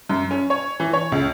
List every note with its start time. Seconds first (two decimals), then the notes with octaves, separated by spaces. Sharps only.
0.09 F#2
0.31 C#4
0.50 C#5
0.80 E3
0.93 C#5
1.12 C#2